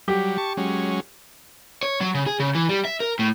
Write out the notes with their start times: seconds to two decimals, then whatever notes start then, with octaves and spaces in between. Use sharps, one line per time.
0.08 F#3 G3 G4
0.38 A5 C#6
0.57 F#3 G#3 C#4
1.83 C#5
2.01 F#3
2.15 C#3
2.27 G#4
2.40 C#3
2.55 E3
2.69 G3
2.85 E5
3.00 A#4
3.19 A2